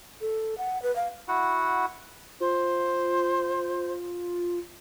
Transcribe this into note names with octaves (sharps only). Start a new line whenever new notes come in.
A4
F#5
B4
F5
E4 F#4 F#5
F4 C5